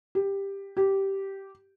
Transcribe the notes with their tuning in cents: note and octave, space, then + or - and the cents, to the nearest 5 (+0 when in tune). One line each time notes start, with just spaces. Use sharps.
G4 +10
G4 -10